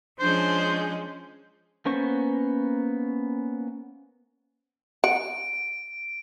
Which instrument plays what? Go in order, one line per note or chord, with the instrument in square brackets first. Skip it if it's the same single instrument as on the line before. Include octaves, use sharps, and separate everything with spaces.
[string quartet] F3 G#3 C#4 [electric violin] D4 G6 [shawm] C5
[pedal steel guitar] A#3 B3 C#4 C5 C#6
[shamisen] F#5 [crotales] D7